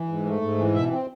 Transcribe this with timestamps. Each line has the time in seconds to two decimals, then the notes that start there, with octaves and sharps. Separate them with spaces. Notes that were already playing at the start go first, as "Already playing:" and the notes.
Already playing: E3
0.09 G#2
0.26 A3
0.41 G#2
0.58 E3
0.74 B2 E5
0.91 C4